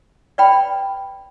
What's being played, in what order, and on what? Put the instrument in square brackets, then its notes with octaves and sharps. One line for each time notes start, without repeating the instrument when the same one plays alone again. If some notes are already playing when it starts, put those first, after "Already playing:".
[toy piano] B4 D5 G5 B5